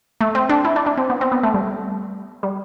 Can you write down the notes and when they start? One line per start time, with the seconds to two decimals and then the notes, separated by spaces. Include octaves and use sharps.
0.21 A3
0.35 C4
0.49 D4
0.65 E4
0.76 D4
0.86 D4
0.98 C4
1.10 B3
1.21 C4
1.32 B3
1.43 A3
1.54 G3
2.43 G3